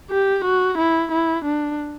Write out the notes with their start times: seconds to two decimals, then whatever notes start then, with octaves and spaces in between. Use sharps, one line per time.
0.11 G4
0.45 F#4
0.78 E4
1.12 E4
1.45 D4